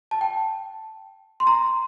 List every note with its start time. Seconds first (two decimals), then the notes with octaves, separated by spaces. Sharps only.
0.11 A5
0.21 G5
1.40 C6
1.47 A#5